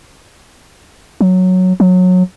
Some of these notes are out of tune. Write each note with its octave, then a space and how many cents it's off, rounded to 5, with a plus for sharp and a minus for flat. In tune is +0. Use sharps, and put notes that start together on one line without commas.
F#3 -5
F#3 -20